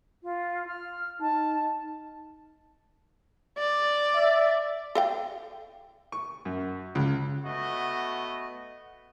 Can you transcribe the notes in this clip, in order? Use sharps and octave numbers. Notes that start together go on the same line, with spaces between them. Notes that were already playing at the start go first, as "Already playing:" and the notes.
F4
F6
D#4 A5
D5
E5
A4 F5 G5
C#6
F#2
C#2
A3 B3 F#4 D#5